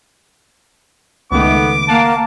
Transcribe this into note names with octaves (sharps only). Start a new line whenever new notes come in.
C#2 D#3 A3 B3 D6
A#3 F5 F#5 A5